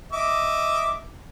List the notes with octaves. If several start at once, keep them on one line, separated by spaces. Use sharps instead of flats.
D#5 E5 D6